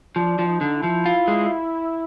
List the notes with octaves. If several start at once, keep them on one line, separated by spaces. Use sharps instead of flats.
F3 D4
F3
D#4
D3
E4
F3
F4
G#3